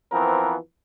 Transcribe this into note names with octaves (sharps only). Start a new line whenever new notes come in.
E3 F3 B3 C4 A#4